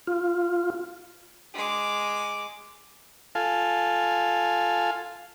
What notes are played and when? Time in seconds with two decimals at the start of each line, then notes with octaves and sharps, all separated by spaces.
0.07 F4
1.54 G#3 D6
3.35 F4 A4 F5 G#5